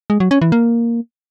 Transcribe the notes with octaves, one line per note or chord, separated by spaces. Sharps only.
G#3
F#3
C#4
E3
A#3